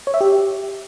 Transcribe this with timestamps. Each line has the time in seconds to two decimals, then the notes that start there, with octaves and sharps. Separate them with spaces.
0.07 C#5
0.14 E5
0.21 G4